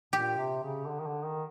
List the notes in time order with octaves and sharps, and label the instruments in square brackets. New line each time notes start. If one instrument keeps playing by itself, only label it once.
[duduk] A#2 [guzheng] G4
[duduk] C3
C#3
D3
D#3
D3
D#3